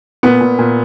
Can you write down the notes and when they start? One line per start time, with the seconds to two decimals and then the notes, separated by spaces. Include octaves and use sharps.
0.23 A#2 B3
0.41 A#2
0.59 A#2